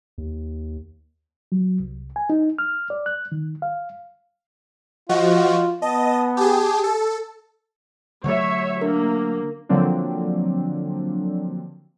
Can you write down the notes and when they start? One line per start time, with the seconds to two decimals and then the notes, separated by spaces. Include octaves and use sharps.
0.18 D#2
1.52 F#3
1.80 C2
2.16 G#5
2.30 D#4
2.59 F6
2.90 D5
3.06 F#6
3.32 D#3
3.62 F5
5.09 F3 F4 F#4 D#5
5.82 B3 D#5 A5
6.37 G4 G#4 A5
6.84 A4
8.24 D3 F#3 A3 C#5 E5
8.81 A#3 D4 A#4
9.69 D3 F3 F#3 A#3 C4 D4